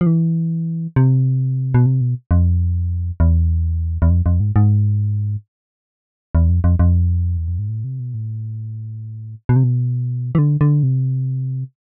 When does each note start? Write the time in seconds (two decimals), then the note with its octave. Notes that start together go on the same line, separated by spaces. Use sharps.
0.01 F3
0.06 E3
0.96 C3
1.74 B2
1.86 C3
2.01 B2
2.31 F2
3.20 E2
4.02 E2
4.10 F2
4.26 F2
4.40 G#2
4.56 G#2
6.35 E2
6.49 F2
6.64 F2
6.79 F2
7.37 E2
7.48 F2
7.59 G#2
7.69 A2
7.84 C3
8.00 B2
8.14 A2
9.49 B2
9.56 C3
9.64 B2
10.35 E3
10.38 D3
10.61 D3
10.83 C3